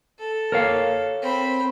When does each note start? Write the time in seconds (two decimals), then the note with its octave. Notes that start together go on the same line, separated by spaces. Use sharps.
0.19 A4
0.52 A#4 C#5 F5
1.22 C4 B5